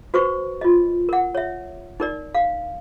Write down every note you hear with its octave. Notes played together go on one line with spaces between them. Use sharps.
F#4 B4 C5 C#6
F4 D#5
A#4 F#5
C#5 E5
D#4 A#4 D5
F5